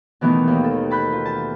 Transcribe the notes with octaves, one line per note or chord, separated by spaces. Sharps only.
B2 D#3 E3 A3 B3 D#4
D#2
A4
A5 B5 F#6 G6
F4
A5